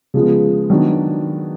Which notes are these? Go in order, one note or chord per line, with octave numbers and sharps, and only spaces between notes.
C#3 F3 G#3 B3
D#3 F#3 B3 D4